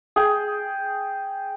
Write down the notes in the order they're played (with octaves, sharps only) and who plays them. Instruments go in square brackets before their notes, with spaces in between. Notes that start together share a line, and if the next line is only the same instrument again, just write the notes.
[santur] G#4 G5